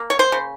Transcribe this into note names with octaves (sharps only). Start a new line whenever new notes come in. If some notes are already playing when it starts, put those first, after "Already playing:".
Already playing: A#3
C#5
C5
C#3